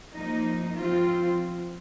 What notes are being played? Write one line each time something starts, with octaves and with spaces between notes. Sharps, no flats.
F3 A#3 D#4
F3 C4 F4